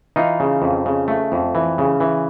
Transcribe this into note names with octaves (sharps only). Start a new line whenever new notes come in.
E3 D#4 F4
C#3
F2
C#3
A3
F2
E3
C#3
E3